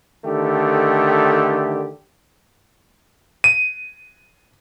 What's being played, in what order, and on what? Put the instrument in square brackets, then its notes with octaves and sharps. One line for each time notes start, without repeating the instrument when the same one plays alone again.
[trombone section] D3 D#3 A3 G4
[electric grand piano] D#7